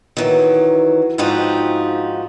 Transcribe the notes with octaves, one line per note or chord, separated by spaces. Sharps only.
D#3 E3 F#3
G#2 D3 F3 D#4 F#4 G4